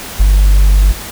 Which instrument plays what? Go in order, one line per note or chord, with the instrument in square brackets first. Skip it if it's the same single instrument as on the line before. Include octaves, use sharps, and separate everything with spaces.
[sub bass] G1